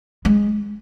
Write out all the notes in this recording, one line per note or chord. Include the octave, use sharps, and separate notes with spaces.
G#3